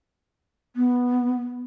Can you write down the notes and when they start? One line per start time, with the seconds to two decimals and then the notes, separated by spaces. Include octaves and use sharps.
0.76 B3